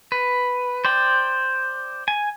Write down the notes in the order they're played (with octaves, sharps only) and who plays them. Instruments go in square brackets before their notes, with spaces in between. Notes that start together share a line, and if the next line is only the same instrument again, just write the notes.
[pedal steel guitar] B4
C5 D5 G5
G#5